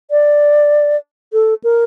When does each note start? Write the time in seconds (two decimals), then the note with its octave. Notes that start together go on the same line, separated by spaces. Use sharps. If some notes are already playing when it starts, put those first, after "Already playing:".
0.11 D5
1.33 A4
1.64 A#4